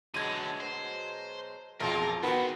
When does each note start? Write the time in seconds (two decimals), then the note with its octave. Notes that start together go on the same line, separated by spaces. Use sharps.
0.14 D2 B2 D3 F#3 G#3 G#6 D#7
0.61 C5
1.80 B1 F2 G#3 A#3 F4 A#4
2.23 D#3 G#3 B3 C4 F#4 B4